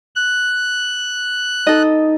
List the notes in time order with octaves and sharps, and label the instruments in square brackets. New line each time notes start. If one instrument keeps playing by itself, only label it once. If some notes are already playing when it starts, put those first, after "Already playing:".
[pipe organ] F#6
[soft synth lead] D#4 [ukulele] A4 D#5